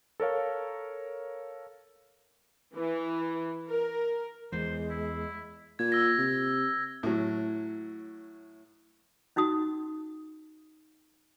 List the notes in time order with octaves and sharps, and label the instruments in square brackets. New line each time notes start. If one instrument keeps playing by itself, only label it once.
[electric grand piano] A4 A#4 C#5 F5
[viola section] E3
A#4
[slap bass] E2 E3 [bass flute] G#3 [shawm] C5
[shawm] E4
[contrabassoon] A#2 [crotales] G#6
[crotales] E6 A#6
[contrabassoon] C3
[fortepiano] A2 F#3
[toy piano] C#4 D#4 F#4 D#6